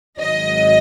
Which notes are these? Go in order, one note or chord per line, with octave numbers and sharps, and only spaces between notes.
G#1 G#2 F#3 D#5